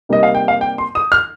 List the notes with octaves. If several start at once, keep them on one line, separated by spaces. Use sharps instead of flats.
C3 G3 A#3 D#4 D#5
F5
G5
F5
G5
C6
D#6
F6